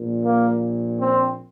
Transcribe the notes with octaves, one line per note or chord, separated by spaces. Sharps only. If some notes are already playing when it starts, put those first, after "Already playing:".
Already playing: A#1 A#2
A#3
C4